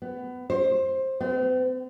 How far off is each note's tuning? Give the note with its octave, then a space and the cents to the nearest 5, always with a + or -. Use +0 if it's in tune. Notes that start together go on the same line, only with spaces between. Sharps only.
B3 +20
C5 +20
C4 -45